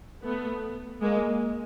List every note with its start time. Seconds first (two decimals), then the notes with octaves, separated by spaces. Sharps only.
0.23 A3 B3
1.02 G#3 A#3